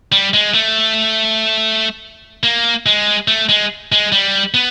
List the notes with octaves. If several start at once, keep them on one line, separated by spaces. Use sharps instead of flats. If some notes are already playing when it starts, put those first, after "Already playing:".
G3
G#3
A3
A#3
G#3
A3
G#3
G#3
G3
B3